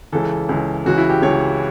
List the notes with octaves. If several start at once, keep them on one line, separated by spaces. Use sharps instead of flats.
C#2 C#3 E3 A4
C#2 C#3 E3
C#2 C#3 E3 F#4
E4
G4
C#2 C#3 E3 C#5